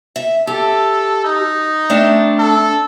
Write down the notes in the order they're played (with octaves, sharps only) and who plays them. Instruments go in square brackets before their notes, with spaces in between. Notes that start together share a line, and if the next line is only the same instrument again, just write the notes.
[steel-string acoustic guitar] E5
[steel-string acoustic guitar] G4 [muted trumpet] A4
[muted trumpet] D#4
[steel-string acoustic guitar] A3 C4 D4
[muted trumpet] A4